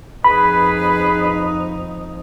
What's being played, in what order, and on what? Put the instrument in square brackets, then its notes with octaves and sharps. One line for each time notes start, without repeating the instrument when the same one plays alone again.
[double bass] F2 D#4 [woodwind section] G#4 B4 [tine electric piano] B5